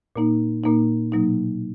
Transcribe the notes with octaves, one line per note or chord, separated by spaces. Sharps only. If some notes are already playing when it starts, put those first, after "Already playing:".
A#2 A#3 D#4
A#2 A#3 D#4
B2 F#3 A#3 D#4